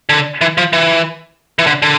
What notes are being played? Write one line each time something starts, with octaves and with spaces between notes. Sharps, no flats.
D3
E3
F3
E3
E3
D3
D3